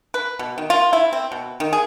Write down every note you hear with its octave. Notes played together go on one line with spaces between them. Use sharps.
B4
B2
D#3
F4
E4
C4
B2
D#3
G#4